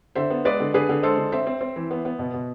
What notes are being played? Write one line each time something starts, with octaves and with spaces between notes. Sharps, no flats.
D3 C5 E5
B3
G#3 B4 D5
D3
D3 G#4 B4
D3
G#3 A4 C5
D3
C4 C5 E5
C4
C4
E3
B3
B3
B2
B2